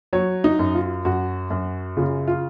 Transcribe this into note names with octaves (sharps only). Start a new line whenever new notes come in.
F#3 C#5
D#4
F#2
F4
F#2 F#4
F#2
C#3 F4
F4